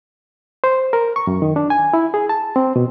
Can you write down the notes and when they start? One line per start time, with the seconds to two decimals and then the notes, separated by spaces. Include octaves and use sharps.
0.64 C5
0.93 A#4
1.16 C#6
1.27 F#2
1.42 D#3
1.56 D4
1.70 G#5
1.93 E4
2.14 G#4
2.29 A5
2.56 C4
2.76 B2